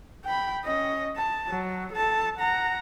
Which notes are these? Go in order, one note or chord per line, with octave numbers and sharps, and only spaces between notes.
G5 B5
C#4 D#5
A5
F#3
A4 A5
F#5 A#5